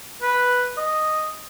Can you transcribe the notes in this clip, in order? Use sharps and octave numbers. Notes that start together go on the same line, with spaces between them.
B4
D#5